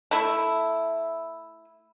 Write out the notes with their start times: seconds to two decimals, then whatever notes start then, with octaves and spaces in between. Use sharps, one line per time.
0.11 A3 E4